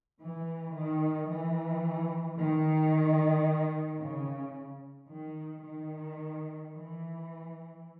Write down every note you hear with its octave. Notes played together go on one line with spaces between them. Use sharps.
E3
D#3
E3
D#3
C#3
D#3
D#3
E3